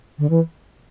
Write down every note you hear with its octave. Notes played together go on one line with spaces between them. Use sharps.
D3
E3